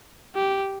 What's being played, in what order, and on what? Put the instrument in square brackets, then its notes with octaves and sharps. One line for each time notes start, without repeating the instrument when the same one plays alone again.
[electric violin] G4